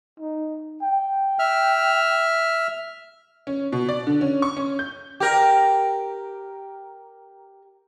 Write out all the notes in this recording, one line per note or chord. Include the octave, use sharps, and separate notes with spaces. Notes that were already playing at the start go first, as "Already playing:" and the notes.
D#4
G5
E5 F6
C#4
B2
D5
D3
C#4
C#6
C#4
G6
G4 A#4